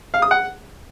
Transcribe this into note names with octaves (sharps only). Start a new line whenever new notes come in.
F5
D#6
F#5